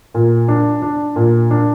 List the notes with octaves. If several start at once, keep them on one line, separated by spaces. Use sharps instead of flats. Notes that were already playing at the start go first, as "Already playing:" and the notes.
A#2
D4
D4
A#2
D4